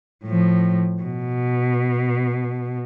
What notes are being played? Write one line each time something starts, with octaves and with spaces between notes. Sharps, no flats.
A2 F3
B2